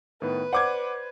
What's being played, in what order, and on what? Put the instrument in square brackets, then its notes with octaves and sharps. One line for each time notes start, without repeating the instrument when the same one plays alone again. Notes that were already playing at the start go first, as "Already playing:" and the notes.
[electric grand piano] A2 D#3 B3 [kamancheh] B4
[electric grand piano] C5 D5 [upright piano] F#5 D6 G#6